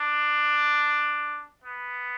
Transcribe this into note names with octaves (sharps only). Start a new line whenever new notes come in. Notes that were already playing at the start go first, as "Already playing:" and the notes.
Already playing: D4
B3